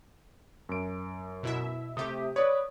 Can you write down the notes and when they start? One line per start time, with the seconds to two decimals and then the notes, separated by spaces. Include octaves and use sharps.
0.69 F#2 D7
1.43 B2 E4 E5
1.97 C3 A3 G4 E5 D#6
2.36 B4 C#5 D5 D#6